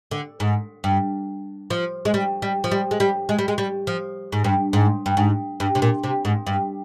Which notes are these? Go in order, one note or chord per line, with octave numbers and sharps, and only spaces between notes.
D3
G#2
G2
F3
G#3
G3
G3
F3
G3
G#3
G3
G#3
G3
G#3
G3
F3
G#2
G2
G#2
G2
G#2
G2
C3
A#2
C3
G#2
G2